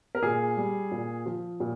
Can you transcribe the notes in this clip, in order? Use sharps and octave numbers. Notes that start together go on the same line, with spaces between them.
A#4
A#2 G#4
G3
A#2
F3
A#2